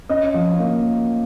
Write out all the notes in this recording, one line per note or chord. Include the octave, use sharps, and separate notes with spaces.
C#4 D#5
F3
A#3